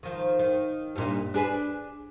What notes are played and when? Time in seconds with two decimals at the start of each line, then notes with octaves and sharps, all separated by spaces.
0.03 D#3 F3
0.39 D#3
0.96 G2 A#2 D#4
1.34 D4 G#4 B4